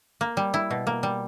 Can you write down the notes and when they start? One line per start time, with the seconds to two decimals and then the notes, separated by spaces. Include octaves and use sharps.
0.21 A#3
0.37 G3
0.54 E4
0.71 B2
0.87 A#3
1.03 G3